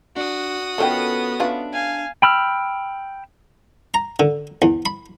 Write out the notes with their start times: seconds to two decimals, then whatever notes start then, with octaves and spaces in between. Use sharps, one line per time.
0.16 D4 F#4 D#6
0.78 D#3 B3 C#4 D4 F4 A4 G5
1.40 C#4 D4 F4 B4 E5
1.73 F5 G#5
2.22 G5 B5 E6 F6
3.94 A#5
4.20 D3
4.62 E2
4.86 B5